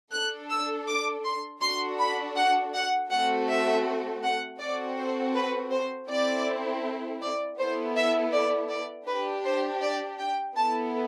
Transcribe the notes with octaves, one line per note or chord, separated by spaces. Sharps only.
D4 A4 F#6
E6
D6
C6
D4 F#4 A4 C6
B5
F#5
F#5
A3 C4 F#4 A4 F#5
E5
F#5
C4 F#4 A4 D5
C5
B4
C5
C4 E4 A4 D5
D5
B3 E4 A4 C5
E5
D5
D5
D4 G4 B4
C5
D5
G5
B3 E4 A4 A5